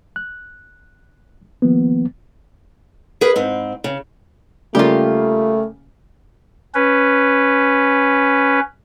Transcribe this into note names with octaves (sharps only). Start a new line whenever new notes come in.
F#6
D#3 F3 A#3 B3
G#4 A#4 B4
G#2 C4
C#3
C#3 G3 A3 A#3 F4 G4
C#4 B4